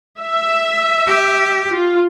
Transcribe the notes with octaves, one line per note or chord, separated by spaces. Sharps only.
E5
G4
F4